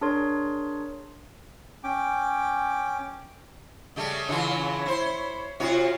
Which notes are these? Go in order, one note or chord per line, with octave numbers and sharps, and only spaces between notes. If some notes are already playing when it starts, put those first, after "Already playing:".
D4 G#4 A#4 C#5 C6
C#4 G5 D6
C#3 G3 A3
C#3 E3 F4 C#5 B5
E4 C5
C3 F4 F#4 C#5